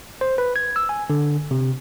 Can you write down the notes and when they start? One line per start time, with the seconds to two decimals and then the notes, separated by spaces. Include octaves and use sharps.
0.21 C5
0.38 B4
0.56 G#6
0.76 E6
0.89 G#5
1.10 D3
1.51 C3